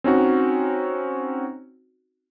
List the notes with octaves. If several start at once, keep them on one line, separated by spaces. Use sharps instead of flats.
C4 C#4 D#4 F#4